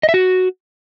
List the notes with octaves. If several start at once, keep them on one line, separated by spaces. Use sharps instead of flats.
D#5
E5
F#4